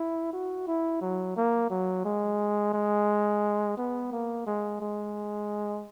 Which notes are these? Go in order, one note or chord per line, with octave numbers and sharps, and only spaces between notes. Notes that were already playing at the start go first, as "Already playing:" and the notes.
Already playing: E4
F#4
E4
F#3
A#3
F#3
G#3
G#3
B3
A#3
G#3
G#3